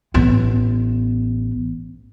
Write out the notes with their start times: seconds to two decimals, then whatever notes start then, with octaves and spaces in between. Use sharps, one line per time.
0.14 A1 B3